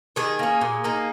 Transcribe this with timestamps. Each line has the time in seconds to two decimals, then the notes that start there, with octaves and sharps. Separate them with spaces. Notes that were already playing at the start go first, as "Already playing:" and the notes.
0.16 D#3 G#4
0.39 A#3 C#4
0.61 A#2
0.84 A#3 D#4